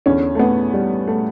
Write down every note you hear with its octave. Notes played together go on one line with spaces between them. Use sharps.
E2 D3 C#4
A3
B3
G3
A3